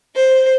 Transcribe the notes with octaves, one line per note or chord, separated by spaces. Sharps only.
C5